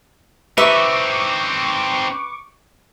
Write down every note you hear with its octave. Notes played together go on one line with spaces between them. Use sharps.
C4 D#4 B4 E5 C#6 D6